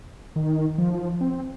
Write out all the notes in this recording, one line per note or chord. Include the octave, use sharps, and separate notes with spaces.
D#3
F3
C4